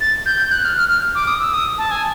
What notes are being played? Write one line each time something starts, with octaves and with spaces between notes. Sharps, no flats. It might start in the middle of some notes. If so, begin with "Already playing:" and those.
A6
G6
G6
F#6
F6
F6
F6
D6
D#6
E6
D#6
A5
G#5